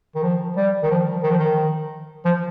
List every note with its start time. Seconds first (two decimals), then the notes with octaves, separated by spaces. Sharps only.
0.15 D#3
0.23 F3
0.57 G3
0.83 D#3
0.91 F3
1.24 D#3
1.31 F3
1.39 D#3
2.25 F3